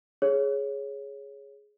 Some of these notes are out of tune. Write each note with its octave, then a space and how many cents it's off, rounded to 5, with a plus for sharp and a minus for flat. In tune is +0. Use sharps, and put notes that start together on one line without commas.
G#4 +5 C#5 +0